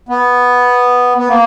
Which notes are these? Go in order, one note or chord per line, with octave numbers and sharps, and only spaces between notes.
B3
B3
A#3